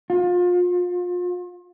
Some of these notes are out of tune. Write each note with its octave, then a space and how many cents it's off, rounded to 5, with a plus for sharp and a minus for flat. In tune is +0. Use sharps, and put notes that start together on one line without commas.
F4 +30